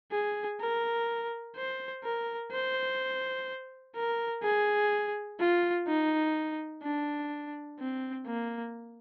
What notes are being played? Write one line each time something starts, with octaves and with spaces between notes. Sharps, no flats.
G#4
A#4
C5
A#4
C5
A#4
G#4
F4
D#4
D4
C4
A#3